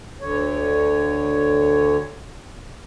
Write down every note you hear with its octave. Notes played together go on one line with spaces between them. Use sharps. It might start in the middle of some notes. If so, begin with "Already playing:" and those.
D2 D3 C#5